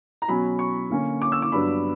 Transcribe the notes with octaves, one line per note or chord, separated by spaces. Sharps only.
A#5
B2 F#3 C#4 B5
C#6
D3 A#3 C#4
D6
E6
D6
G2 F#3 B3 D4 B5